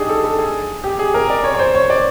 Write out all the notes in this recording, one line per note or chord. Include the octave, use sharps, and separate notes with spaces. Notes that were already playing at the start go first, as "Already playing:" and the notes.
Already playing: D4 D#4 G4 G#4
A4
A4
G#4
G4
G#4
A#4
D5
C#5
C#5
C5
C#5
D5